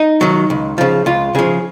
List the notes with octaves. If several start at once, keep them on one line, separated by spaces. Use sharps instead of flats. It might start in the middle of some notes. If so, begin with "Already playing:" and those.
Already playing: D#4
D#3 F#3
C#2
C#3 F3
C#2 F4
C#3 F3 G#4